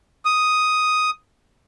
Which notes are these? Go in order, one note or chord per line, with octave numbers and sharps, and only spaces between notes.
D#6